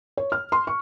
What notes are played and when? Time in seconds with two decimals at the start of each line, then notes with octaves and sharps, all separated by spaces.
0.17 C#5
0.32 F6
0.52 C6
0.67 C#6